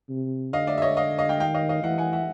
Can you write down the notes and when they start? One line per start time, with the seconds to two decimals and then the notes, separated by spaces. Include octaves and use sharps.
0.10 C3
0.53 D3 D#5 F5
0.67 D5 E5
0.78 E5
0.82 C#5 D#5
0.97 D#5 F5
1.19 D#5 F5
1.29 F5 G5
1.40 D#3 F5 G5
1.54 D#5 F5
1.69 D#5 F5
1.84 E3 E5 F#5
1.98 F#5 G#5
2.13 E5 F#5